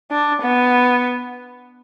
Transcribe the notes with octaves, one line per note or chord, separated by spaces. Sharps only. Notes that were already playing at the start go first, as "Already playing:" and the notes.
D4
B3